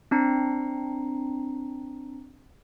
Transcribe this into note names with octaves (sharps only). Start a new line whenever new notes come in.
C4 D4 A#5 C7 C#7